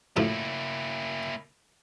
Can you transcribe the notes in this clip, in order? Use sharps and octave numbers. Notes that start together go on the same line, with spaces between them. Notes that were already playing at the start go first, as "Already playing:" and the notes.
F#2 A2 F3 A#3 E4